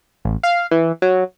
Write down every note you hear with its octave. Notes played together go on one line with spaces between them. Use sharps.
A1
F5
E3
F#3